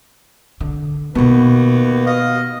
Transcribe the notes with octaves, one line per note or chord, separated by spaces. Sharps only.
D3
D#2 B2 B3 F#4 B4
D#5 F5